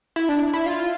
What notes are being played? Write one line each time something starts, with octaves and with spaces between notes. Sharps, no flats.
E4
D4
E4
F4